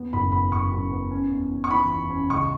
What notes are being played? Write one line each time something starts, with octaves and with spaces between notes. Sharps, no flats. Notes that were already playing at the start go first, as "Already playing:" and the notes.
Already playing: E2 B3
F#1 B5
B3 B5
F#1 C#6
F#2
B3
C#4
E2
E2
C#6
E3 B5
E2
C#4
C#2 C#6